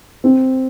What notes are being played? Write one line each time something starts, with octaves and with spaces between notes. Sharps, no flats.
C4